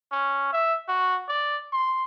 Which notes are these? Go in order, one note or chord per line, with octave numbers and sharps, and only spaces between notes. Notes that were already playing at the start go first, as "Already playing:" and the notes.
C#4
E5
F#4
D5
C6